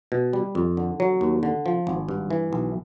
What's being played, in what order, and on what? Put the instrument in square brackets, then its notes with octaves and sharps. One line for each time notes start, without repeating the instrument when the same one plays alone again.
[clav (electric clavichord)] B2
G3
F2
D3
F#3
D#2
D3
F3
G#1
G2
E3
B1